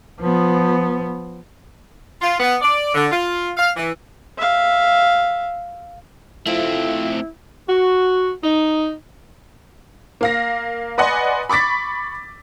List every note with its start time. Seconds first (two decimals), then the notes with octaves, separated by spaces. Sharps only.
0.20 F3 B3
2.22 F4
2.40 B3
2.61 D5
2.94 D3
3.11 F4
3.56 F5
3.76 E3
4.38 E5 F5
6.47 A3 C4 E4 F4
7.68 F#4
8.43 D#4
10.21 A#3 F5 A#6
10.98 B4 D5 D#5 F#5 G#5 C6
11.49 B5 C#6 D6 A6 B6